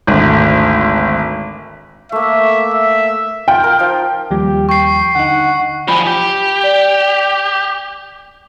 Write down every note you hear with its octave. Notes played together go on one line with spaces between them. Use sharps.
G#1 D2
A3 A#3 E5
E5
F4 G5
A#4
F3 D#4
D#2 F3 G3 G4
G5 C#6 C7
D3 D#4 F#5
F3 G3 G#5 B5
G4
D5